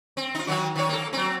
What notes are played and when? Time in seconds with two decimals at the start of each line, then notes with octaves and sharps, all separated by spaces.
0.17 C4
0.35 D#4 F4
0.47 D#3 F#3 F#4
0.76 D#3 C#5
0.89 A#3 A4
1.13 F#3 C4